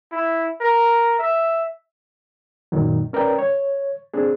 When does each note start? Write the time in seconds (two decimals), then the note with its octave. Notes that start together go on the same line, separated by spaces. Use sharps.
0.12 E4
0.61 A#4
1.19 E5
2.72 F#2 A#2 D#3 F#3
3.13 C#4 A#4 B4 D5 G5
3.39 C#5
4.14 C4 D4 G#4